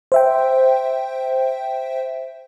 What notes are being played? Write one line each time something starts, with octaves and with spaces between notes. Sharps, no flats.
C5 E5 G5